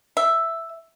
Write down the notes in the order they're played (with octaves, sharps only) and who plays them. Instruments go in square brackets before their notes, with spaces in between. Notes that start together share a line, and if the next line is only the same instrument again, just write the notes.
[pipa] E5